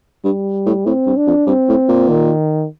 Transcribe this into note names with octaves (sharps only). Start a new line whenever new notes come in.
G2 G3
A2
A2 C4
G2
D4
F2
G2 C4
A2
A#2
D#3